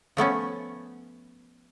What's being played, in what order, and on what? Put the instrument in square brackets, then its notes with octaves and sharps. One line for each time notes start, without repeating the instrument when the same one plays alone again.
[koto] F3 A3 B3 C#4